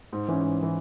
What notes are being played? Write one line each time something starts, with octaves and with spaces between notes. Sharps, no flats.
G#2
E3 C#4
G#2
E3 C#4